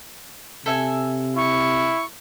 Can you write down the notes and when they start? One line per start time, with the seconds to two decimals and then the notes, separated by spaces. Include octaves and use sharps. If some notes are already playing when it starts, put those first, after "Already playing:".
0.66 C3 A4 E5 G#5
1.36 E4 C#6